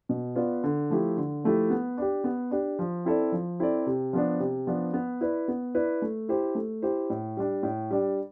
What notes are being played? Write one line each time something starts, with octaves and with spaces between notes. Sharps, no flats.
B2
B3 F4 B4 D5
D3
F3 A3 E4 G4
D3
F3 A3 E4 G4
B3
D4 G4
B3
D4 G4
F3
C4 E4 A4 D5
F3
C4 E4 A4 D5
C3
F3 B3 D4
C3
F3 B3 D4
B3
E4 B4 D5
B3
E4 B4 D5
A3
E4 G4 C5
A3
E4 G4 C5
A2
G3 D4
A2
G3 D4